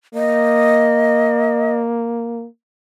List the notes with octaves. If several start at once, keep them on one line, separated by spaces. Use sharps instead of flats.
A#3 D#5